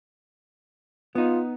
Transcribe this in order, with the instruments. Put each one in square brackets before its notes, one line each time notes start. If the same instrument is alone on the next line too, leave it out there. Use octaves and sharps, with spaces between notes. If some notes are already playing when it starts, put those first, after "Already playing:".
[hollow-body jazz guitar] B3 D#4 [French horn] F4